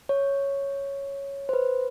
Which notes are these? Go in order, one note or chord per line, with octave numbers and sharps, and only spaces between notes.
C#5
C5
B4